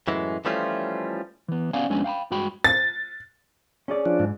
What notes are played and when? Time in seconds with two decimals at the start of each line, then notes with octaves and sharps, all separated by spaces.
0.08 F#2 A2 E3 G#3
0.45 E3 F3 G3 A3 C#4 F4
1.48 E3 B3
1.73 B3 C#4 D5 F5 F#5 G#5
1.90 F2 G#3 B3 C#4 D4 G#5
2.04 F5 G5 A#5 B5
2.31 G2 G#3 F#4 G5 B5
2.64 A6
3.88 C#4 G#4 D5
4.06 F3 D4
4.19 G#2